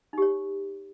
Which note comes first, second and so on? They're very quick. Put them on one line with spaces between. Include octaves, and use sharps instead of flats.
D#4 G4 C#5